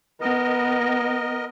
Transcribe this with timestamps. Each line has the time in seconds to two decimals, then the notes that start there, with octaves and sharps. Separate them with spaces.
0.21 B3 A#4 D#5